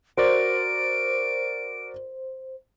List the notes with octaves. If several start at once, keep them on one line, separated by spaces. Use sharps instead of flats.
F#4 A#4 C5 D5 D7